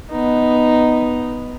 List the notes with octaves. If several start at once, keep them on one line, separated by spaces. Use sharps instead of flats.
B3 D#4